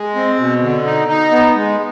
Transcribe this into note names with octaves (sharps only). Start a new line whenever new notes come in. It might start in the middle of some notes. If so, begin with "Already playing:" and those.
Already playing: G#3
C4
B2
D3
D#4
D#4
B3
G#3